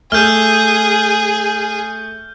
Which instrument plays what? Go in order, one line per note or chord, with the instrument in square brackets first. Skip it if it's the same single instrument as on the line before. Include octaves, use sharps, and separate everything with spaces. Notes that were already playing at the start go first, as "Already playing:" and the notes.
[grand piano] A3 [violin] G#4 [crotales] F6 G6